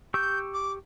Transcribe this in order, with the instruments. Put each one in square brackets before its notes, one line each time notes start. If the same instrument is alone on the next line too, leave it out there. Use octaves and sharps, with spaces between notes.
[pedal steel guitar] G4 C#6 E6 [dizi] G6
[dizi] D6